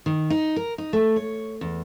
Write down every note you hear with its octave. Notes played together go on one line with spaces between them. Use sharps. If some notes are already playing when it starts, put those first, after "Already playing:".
D#3
D#4
A#4
D#4
A3
C#5
E2